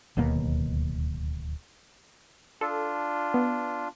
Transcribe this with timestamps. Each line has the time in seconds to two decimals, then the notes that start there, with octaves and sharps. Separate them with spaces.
0.17 D1 D#2 B2 A#3
2.61 D4 F4 A4
3.34 B3